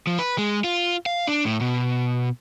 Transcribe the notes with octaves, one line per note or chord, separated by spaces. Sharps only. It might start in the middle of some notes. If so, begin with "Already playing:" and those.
F3
B4
G#3
F4
F5
D4
A2
B2